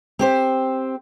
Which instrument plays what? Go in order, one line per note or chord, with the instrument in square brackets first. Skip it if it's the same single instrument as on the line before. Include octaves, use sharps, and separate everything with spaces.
[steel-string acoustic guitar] C4 G4 C5